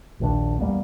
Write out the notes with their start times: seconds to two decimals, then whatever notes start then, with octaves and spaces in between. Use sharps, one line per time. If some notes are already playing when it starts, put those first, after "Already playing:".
0.20 A#1 D#2 F3 D4
0.59 E2 G3 A#3 B3